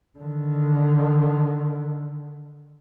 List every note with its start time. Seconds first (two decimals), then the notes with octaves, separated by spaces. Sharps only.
0.19 D3 D#3